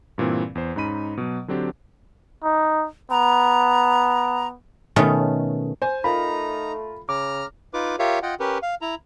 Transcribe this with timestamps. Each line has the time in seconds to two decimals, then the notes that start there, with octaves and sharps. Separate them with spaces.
0.18 G2 A#2 E3 C4
0.55 E2 C5
0.76 G#2 C#4 D#4 B5 D#7
1.17 B2 F#3
1.48 D3 F#3 C4 D4 G4
2.44 D#4
3.11 B3 A#5
4.96 B2 D#3 A3 C#4
5.82 C5 G#5
6.04 A3 D#4 F4 A#4 A#5 B5
7.09 C#3 A#5 D6 F6
7.73 D#4 F4 B4 D6
7.99 F4 G4 A#4 C#5 E5 F5
8.22 F4 D#5 F#5 G5
8.40 C#4 G4 A#4 B4
8.62 F5
8.81 E4 A#5